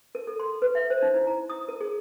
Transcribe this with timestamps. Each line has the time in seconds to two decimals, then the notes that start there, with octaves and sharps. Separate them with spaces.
0.15 A#4
0.27 A4
0.40 C6
0.62 B4
0.75 E5
0.90 C5
1.02 D#4
1.14 E4
1.27 A#5
1.50 D#6
1.68 A#4
1.81 G#4